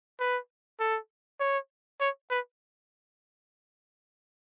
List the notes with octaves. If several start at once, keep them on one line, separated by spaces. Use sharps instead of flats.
B4
A4
C#5
C#5
B4